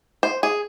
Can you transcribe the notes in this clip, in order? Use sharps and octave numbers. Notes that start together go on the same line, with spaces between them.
C5
G#4